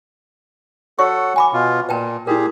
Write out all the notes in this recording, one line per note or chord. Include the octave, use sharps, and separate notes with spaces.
F#4 A4 C#5 F#5 C#6
G#5 B5 D6
B2 F4
A#2 B4 G5 A5
A#2 E4 G4 G#4 A#4